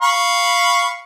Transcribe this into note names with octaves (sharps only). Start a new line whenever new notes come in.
F5 B5 C#6